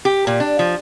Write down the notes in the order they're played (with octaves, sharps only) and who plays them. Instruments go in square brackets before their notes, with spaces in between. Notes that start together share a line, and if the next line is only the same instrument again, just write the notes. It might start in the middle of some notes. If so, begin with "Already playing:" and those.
[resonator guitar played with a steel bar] G4
A#2
D4
F3